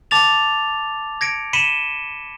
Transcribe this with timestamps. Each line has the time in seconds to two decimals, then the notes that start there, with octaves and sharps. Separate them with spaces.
0.11 A5 D6 A6 F7
1.21 G#6 A#6 C#7 D7
1.53 B5 B6 C#7 D#7 E7 G7